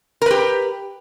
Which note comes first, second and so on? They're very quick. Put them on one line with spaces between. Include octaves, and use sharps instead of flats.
A#4 B4 G4